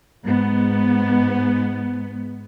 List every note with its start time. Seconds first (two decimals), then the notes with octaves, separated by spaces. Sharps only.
0.24 G#2 B3